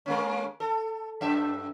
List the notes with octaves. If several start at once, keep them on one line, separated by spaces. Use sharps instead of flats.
G#3 A#3 C#4
A4
F#2 E5